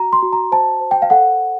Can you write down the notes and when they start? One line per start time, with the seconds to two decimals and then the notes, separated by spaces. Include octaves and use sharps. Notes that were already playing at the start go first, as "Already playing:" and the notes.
Already playing: F#4 A#5
0.13 C6
0.22 F#4
0.33 A#5
0.52 C5 A5
0.81 C5
0.91 G5
1.02 F5
1.10 A4 F#5